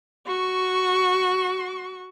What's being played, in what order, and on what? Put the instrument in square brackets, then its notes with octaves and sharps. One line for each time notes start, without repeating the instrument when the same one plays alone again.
[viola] F#4 C#6